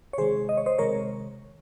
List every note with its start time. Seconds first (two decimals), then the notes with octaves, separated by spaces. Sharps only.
0.13 C#5
0.18 C3 D#3 G#3 G#4 C5
0.49 D#5
0.57 C#5
0.66 C5 D#5
0.78 C3 D#3 G#3 A#4 C#5